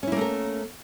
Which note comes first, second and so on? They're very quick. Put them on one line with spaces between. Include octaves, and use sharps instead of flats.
C#4 E4 A#3 A3 A#4